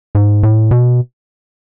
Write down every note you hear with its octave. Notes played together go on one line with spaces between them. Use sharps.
G#2
A2
B2